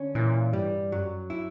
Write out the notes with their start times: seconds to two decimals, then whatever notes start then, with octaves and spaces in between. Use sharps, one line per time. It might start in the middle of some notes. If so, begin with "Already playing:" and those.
Already playing: D3 C#4
0.15 A#2 E3
0.53 G2 G3
0.92 F#2 F#3
1.30 E4